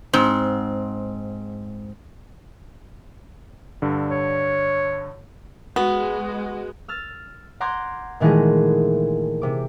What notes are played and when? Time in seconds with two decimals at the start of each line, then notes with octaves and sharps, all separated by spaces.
0.13 G#2 C4
3.82 G2 D3
4.10 C#5
5.76 G#3 B3 F#4
6.88 E6 F6 A6
7.60 F#5 A#5 C6 D6 G6 G#6
8.20 A#2 D#3 E3 G#3 A3 G#4
9.42 C3 D6